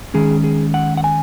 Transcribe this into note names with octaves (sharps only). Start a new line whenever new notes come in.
D#3 G#3 C#4 G#4
G#4
F#5
F#5
G#5